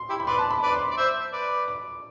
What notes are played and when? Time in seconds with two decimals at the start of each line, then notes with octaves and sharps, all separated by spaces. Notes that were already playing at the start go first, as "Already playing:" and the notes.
Already playing: C6
0.09 E4 G4
0.20 B5
0.27 B4 D5 C6
0.39 A5
0.51 B5
0.63 B4 D5 B5
0.73 C6
0.91 D5
0.98 C5 E5
1.32 B4 D5
1.68 D6